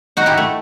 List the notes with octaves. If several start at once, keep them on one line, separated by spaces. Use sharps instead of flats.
D#4 F#4
E4 G4
A3